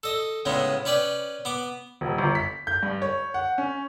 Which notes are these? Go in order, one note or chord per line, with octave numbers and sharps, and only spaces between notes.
A4 D#5
A2 C#3 G#3 B3 C#4
C#4 B4 D5 G5
B3 D6
D#1
G1
B6
G6
G2
C#5
F#5
C#4